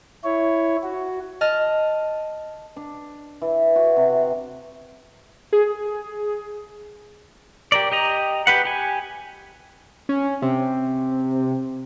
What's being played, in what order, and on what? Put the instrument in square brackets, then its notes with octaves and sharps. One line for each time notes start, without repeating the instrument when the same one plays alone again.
[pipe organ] E4 C#5
F#4
[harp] D#5 A5 F6
[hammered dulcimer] D4
E3
F#4
C3
[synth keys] G#4
[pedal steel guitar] G4 A#4 D5
G4 D#5 A#5
G4 B4 F#5
G4 G#5
[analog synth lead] C#4
C3